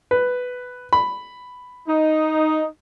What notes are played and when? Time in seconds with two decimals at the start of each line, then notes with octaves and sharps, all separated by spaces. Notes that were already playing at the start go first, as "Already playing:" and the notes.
0.11 B4
0.93 B5
1.88 D#4